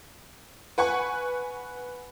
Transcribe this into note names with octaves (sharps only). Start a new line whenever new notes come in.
B4 F#5 G#5 C#6